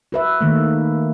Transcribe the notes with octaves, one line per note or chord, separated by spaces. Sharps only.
F#4 B4 E5
D#3 A3 A#3